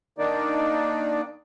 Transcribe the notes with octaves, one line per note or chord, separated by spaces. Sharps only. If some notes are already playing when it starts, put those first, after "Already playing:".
D#3 A#3 D4 D#4 D5